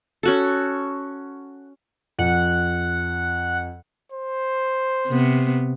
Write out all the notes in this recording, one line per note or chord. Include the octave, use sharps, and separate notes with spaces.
C#4 F#4 A4
F2 F#5
C5
C3 B3